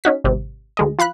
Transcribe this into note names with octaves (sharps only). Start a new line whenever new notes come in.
C#4 D#4 F#4 B6
G#1 C3
D2 G#3 D#5
F3 F5 B5 F#6